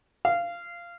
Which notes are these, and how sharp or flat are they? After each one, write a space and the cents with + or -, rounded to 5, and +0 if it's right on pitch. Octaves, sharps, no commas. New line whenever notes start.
F5 -15